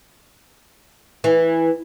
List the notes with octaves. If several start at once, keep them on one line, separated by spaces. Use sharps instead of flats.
E3